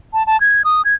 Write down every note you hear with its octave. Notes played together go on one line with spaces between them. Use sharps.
A5
A5
G#6
D#6
G#6